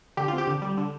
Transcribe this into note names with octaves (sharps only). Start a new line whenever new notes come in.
D3 G4
F4
C4 G4
D3
G3
D3